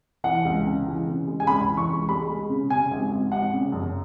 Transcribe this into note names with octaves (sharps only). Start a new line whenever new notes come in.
E3 F#5
C#2
C#3
E3
C#3
G#3
G#5
C#2 B5
E3
C#6
C#2
G#3 B5
G#3
C#3
C#3 G#5
G#1
G#1
G#1 F#5
C#3
F#2